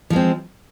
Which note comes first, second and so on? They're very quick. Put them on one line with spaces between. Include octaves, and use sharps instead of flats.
F3 G#3 C4